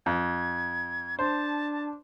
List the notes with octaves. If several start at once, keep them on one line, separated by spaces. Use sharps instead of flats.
F2 G#6
D4 C5 A5